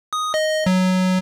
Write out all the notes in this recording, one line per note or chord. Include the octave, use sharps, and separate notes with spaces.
D#6
D#5
F#3